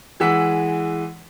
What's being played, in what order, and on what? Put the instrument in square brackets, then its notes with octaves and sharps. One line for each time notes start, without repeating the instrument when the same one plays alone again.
[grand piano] E3 G#3 F#5 E6 B6